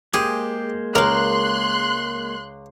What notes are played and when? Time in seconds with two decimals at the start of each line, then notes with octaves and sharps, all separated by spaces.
0.14 G#3 A#3 G4 G#4 C5
0.95 C#2 A#4 F5 C6 F#6